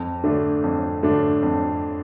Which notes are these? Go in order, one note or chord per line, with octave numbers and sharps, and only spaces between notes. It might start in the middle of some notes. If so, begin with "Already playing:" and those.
Already playing: F2
D3 A3 D4
F2
D3 A3 D4
F2